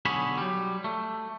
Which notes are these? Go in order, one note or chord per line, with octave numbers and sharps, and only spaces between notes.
B1 D3 G#4 C#5 B5
F#3 G3
A3